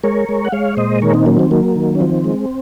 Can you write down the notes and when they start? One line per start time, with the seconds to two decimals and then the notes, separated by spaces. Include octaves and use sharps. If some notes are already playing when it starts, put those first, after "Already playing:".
0.04 G#3 A#4 C#5
0.29 G#3
0.45 F#5
0.52 G#3 C#5 F5
0.77 A#2 C5 D#5
1.02 D#3 A#4 C#5
1.14 C4 D#4
1.26 F#3 A#3 C#4
1.39 C4
1.51 F#3 A#3
1.76 D#3
1.95 C#4
2.00 F3 C4
2.24 G#3